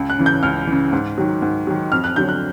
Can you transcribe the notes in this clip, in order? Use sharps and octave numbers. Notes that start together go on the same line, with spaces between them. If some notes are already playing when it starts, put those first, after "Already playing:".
Already playing: C#2
F#6
C#3 E3
G6
C#2 F6
C#3 E3
G#2
D#3 F#3
G#2
D#3 F#3
F2 F6
F#6
D3 F#3 G6
F#6